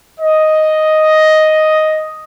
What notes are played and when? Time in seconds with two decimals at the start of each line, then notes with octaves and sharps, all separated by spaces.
0.20 D#5